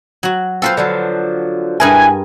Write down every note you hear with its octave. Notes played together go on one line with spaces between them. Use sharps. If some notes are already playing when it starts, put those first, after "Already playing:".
F#3 F#4
C4 F4 A4 B4 C5
D3 F3 F#3
G2 E4 G#4 A#4 B4 G#5